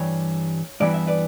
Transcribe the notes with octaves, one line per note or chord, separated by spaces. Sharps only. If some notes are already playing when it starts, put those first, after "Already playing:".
Already playing: G2 E3 G3 C#5
G2 E3 G3 B3 E4 D5
E5
B4 D5